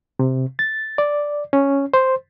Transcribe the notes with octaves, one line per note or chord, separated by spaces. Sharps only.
C3
A6
D5
C#4
C5